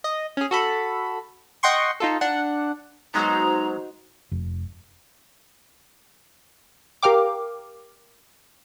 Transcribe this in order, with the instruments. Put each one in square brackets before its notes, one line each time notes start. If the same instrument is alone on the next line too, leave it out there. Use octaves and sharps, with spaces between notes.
[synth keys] D#5
C#4 G#4
F#4 A4 B5
D#5 F#5 G5 C6 C#6
D#4 F4 A4
D4 F#5
[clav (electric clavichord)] F#3 G#3 B3 [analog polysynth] D#4 F#4 C5 [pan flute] A#5
[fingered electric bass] F1
[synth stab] G4 A#4 F5 G5 D6